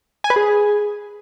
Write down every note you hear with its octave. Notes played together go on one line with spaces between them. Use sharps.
G#5
B4
G#4